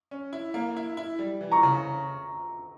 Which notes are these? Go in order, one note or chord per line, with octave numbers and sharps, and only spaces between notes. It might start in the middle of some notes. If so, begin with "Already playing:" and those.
C#4
E4
A#3
E4
E4
G3
E3
A#5 C#6
C#3